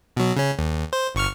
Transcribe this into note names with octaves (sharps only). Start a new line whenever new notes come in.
B2 F#3
C#3 C#4
D#2
C5
G1 C#6 F6